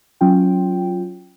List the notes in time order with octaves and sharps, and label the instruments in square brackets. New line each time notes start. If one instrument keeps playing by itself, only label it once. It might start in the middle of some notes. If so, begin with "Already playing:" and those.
[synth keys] F#3 C#4 F4 G5